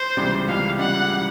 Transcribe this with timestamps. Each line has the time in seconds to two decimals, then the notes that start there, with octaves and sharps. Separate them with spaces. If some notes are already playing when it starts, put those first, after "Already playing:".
Already playing: C5
0.17 C#2 C#3 E3 G3
0.48 C#2 C#3 E3 G3 F5
0.78 C#2 C#3 E3 G3 F#5
1.09 C#3 E3 G3